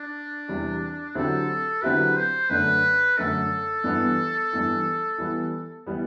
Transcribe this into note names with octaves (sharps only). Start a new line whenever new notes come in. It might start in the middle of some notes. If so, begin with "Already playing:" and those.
Already playing: D4
E2 C3 G3
D3 F#3 C4 E4 G4 A4
D3 F#3 C4 E4 G4 B4
C5
F#2 D3 A3 D4 B4
F#2 D3 A3 D4 A4
G2 E3 B3
G2 E3 B3
E3 G3 B3
E3 G3 B3